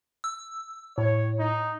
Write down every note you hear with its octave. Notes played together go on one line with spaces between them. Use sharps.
E6
A2 C#5
D#4